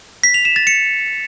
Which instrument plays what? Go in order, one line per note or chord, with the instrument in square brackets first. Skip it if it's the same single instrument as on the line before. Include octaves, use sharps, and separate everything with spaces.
[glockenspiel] B6
F7
E7
A6
C#7